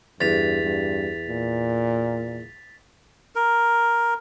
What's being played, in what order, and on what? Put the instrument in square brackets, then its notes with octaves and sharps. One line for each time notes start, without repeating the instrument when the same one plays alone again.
[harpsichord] E2 [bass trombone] G2 [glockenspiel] A6 B6 F7
[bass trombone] G2
A#2
[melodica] A#4